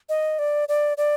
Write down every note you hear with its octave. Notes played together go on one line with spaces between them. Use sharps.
D#5
D5
D5
D5